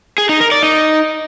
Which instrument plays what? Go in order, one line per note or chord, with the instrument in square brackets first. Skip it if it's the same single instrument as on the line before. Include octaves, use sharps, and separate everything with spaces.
[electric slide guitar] G#4
D#4
A#4
D5
D#4